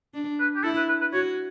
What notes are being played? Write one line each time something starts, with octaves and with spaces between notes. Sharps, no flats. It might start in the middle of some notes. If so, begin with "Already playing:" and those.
D4
B4
G4
E4 A4
B4
B4
B4
F#4 C#5